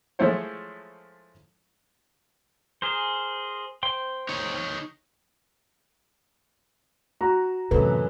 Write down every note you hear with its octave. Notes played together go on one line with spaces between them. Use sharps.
F3 G#3 A3 E4 C5 C#5
G#4 A#4 C5
C5 G5 C6
D#4 C#5
F#4 A#5
F#2 A2 C3 E3 A4 B4